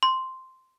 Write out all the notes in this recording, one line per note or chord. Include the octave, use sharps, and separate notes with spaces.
C6